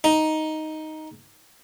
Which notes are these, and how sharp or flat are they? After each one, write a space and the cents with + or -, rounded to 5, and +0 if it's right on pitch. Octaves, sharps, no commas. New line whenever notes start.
D#4 +5